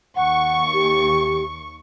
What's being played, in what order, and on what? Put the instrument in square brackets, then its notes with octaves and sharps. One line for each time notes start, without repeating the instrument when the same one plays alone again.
[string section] D#2 C#6 [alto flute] F#5
[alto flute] G4